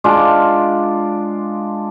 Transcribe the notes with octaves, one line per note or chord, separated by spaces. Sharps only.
G#3 D4 F4 D5